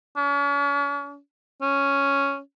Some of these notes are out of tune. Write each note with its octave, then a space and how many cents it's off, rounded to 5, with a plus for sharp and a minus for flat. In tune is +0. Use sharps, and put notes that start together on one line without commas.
C#4 +40
C#4 +5